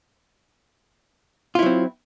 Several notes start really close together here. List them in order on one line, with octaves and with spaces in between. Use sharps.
F4 E4 F#3 C4